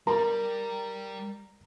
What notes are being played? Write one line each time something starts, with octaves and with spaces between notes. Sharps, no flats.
G3 A#4 A#5